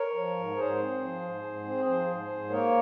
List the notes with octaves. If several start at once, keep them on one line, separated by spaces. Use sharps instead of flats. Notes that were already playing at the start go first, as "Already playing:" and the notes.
Already playing: A#4 C#5
F3
G#2
G#2 G#4 C5
C4
F3
G#2
G#2
C4
F3 G#4 C5
G#2
G#2
A#3 A#4 C#5